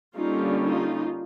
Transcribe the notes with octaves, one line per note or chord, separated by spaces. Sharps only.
D3 G3 A#3 C#4 D#4 F4
D#4 F4